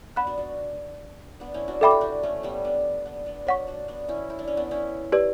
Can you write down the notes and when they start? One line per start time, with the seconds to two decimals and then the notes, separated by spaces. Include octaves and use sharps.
0.16 B3 D4 F#5 B5 F#6
0.27 D4 F#4
0.38 D4 F#4
1.40 B3 D4
1.54 C#4 E4
1.68 D4 F#4
1.81 F#4 A4 E5 G5 B5 D6
1.91 G4
2.01 D4 F#4
2.23 A3 C#4
2.43 G3 B3
2.65 B3 D4
3.05 B3 D4
3.26 B3 D4
3.47 D4 F#4 C#5 F#5 C#6
3.67 D4 F#4
3.88 B3 D4
4.08 C#4 E4
4.30 E4
4.39 D4
4.48 C#4
4.57 B3 D4
4.71 C#4 E4
5.12 G4 B4 D5